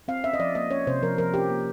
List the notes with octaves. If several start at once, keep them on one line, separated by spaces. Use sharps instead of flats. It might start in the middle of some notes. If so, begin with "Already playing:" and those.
C4 F5
C#4 E5
D#5
F3 D5
A#3 D#5
C#4 C#5
C3 C5
F3 A#4
F3 A#4
C#4 G4
A#3